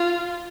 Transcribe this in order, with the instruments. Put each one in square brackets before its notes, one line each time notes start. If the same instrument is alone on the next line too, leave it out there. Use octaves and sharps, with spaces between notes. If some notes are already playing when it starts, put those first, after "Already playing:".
Already playing: [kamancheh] F4